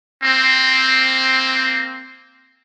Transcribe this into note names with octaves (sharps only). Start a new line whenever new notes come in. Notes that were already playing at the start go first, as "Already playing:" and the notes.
A#3 C4